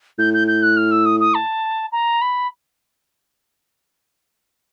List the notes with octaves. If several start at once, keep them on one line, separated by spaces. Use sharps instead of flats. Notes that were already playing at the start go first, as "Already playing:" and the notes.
A2 G6
G6
G6
F#6
F6
E6
D#6
D#6
A5
A#5
B5